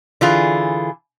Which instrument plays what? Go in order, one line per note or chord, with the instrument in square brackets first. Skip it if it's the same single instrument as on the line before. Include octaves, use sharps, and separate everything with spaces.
[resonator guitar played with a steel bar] D3 E3 F4 G#4